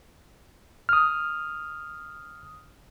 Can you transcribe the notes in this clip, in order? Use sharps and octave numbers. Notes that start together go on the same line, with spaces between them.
D#6 F6